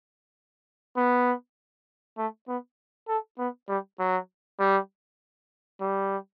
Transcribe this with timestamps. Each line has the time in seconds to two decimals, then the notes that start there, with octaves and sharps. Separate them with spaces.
0.96 B3
2.17 A3
2.48 B3
3.08 A4
3.38 B3
3.68 G3
3.99 F#3
4.60 G3
5.81 G3